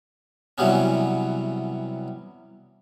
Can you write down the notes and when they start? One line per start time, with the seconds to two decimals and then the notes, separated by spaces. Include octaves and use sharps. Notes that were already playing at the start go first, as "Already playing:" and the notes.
0.58 C3 E3 F#3 G3 B3 C#4